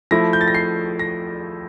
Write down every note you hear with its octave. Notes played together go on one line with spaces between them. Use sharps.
F3 A3 E4 A#6
G6
A6
A#6
C7
A#6